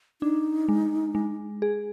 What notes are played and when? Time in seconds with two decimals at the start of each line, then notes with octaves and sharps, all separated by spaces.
0.22 D4 D#4
0.69 G#3
1.15 G#3
1.62 G#4